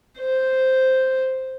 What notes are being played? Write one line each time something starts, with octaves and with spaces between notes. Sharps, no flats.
C5